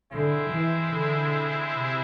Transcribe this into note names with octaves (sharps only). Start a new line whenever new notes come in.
D3 G#3 C4 E4
E3
D3
C3